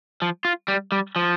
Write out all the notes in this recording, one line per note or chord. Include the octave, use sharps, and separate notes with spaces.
F3
F4
G3
G3
F3